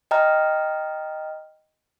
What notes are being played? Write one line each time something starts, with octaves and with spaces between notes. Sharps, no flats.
D#5 G5 A#5 F6